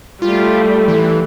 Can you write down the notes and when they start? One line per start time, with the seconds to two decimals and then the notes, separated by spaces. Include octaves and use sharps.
0.22 G3 A3 F4
0.88 E3